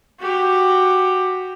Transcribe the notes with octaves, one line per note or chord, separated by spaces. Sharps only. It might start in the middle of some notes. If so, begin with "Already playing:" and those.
F#4 G4